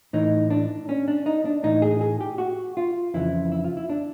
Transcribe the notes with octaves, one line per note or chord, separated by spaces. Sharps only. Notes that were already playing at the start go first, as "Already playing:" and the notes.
A2 E3 D#4
D4
C#4
D4
D#4
D4
A2 E3 D#4
G#4
G#4
G4
F#4
F4
F2 C#3 E3 E4
E4
F4
E4
D4